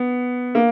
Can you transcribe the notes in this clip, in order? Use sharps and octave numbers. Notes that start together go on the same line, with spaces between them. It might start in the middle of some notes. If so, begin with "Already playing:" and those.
Already playing: B3
A#3